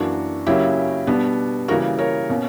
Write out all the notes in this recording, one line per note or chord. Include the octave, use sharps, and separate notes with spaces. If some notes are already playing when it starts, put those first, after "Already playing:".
Already playing: F#2 E3 A#3 D4 F#4
C#3 F#3 A#3 C#4 E4 G4
B2 G3 B3 D4
C#3 E3 G3 A#3 F#4 A#4
A#4 C#5
B2 A#3 C#4